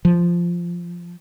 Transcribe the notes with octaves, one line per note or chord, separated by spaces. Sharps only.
F3